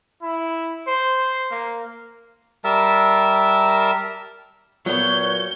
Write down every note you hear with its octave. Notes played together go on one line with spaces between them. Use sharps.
E4
C5
A#3
G3 A#4 E5 A5
A#2 F#3 B3 C#5 G6